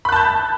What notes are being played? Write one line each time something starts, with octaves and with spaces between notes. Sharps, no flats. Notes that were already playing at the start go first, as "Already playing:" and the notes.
A5 B5 F#6 G6